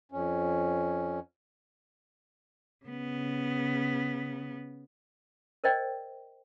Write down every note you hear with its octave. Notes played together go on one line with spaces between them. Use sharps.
F2 C#4
C#3 B3
A#4 C5 D5 D#5 G5